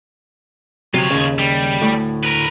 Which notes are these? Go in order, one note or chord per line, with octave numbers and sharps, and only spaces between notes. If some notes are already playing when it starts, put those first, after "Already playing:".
C3 F#3 F4 C#5
D#2 C#3
G3
D2 A2
A#4 B4